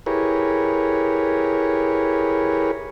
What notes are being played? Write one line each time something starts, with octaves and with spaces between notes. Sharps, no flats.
E4 G4 G#4 A#4 B4 C#5